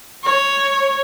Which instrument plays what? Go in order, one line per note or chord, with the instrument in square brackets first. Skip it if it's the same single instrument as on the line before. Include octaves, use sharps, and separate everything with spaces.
[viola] C#5